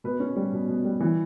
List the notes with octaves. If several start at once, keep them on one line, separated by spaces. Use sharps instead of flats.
B2 B4
C#4
G3
B2
B2
G3
E3